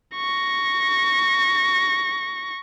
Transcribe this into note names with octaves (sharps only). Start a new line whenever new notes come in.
C#6 A#6